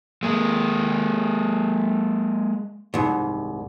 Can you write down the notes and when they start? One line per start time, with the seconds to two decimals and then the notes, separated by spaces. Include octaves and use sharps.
0.23 G#3 A#3
2.94 C2 G#2